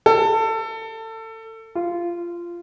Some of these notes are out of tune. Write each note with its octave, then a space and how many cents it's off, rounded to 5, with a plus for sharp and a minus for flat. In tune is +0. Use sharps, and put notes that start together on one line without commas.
A4 +25
F4 -15